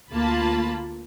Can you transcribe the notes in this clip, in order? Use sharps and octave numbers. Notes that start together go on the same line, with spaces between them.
D2 A#3 F4 A5 B5